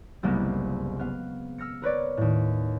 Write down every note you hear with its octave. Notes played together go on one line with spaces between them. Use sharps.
F#1 C2 G#3 A#3 B3
B3 F5
E6 F6 A#6 C#7
A#4 B4 C#5 D5
D#2 A2